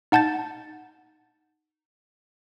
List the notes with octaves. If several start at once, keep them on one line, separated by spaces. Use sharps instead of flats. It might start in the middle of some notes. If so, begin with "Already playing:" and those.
D#4 F#5 A5 G6 A6